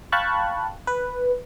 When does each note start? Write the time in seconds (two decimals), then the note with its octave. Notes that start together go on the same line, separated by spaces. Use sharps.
0.12 F5 G5 A5 B5 C#6 F#6
0.87 B4